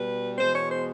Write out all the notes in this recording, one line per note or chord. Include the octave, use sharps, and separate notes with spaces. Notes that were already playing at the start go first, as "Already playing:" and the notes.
Already playing: B2 G3 B4
E2 B2 G#3 C5
C#5
C5